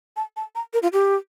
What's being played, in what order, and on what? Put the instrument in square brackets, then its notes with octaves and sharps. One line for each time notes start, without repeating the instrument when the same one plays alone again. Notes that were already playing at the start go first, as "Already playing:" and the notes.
[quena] A5
A5
A#5
A#4
F4
G4